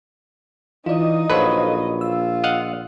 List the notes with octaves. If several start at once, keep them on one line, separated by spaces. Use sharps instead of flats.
E3 D#4 F4 D5 D#5
A#1 F#3 A4 B4 C5 F5
F4 E6
D#5 F5 F#5